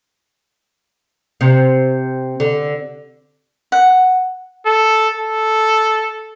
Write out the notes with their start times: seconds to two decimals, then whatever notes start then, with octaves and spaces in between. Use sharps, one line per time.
1.41 C3
2.40 D3
3.72 F#5
4.66 A4
5.18 A4